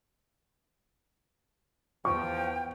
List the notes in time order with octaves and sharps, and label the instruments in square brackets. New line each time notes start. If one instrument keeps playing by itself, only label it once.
[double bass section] E2 B3 [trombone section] F3 [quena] G5 [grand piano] C#6